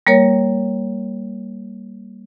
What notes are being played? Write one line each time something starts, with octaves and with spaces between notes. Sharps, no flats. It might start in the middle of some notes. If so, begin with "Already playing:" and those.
G3 A#3 A#4 C#5